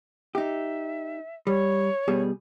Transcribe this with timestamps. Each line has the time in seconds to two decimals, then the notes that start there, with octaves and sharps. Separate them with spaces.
0.35 D#4 G4 E5
1.47 G3 C#5
2.08 B2 G3 G#4